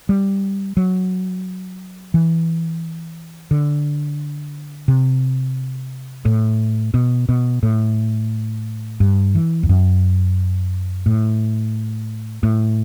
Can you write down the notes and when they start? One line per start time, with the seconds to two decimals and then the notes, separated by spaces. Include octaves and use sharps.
0.09 G3
0.77 F#3
2.14 E3
3.51 D3
4.88 C3
6.25 A2
6.94 B2
7.29 B2
7.63 A2
9.00 G2
9.35 E3
9.63 E2
9.69 F#2
11.06 A2
12.43 A2